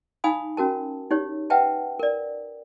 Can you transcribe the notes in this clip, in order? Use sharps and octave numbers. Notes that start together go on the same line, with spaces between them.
D#4 F5 G#5 B5 D#6
C#4 F#4 A#4 A5
D#4 G4 C#5
B4 E5 F#5 G5 A5
A#4 D5